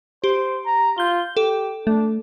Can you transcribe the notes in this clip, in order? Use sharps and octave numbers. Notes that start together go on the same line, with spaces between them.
G4 C5
A#5
F4 G6 G7
G4 A4
A3 D4